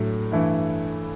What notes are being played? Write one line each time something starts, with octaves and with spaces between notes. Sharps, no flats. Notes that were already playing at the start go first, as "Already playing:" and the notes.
Already playing: A2 F#3 A3 D4
G2 E3 A3 E4